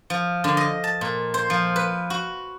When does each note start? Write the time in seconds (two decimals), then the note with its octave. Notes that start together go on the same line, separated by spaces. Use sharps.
0.10 F3
0.44 D3
0.57 D#5
0.84 A5
1.01 A#2
1.34 C5
1.50 F3
1.76 B4
2.10 F#4